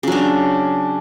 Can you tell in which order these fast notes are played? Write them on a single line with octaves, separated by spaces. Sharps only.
C#3 F#3 D4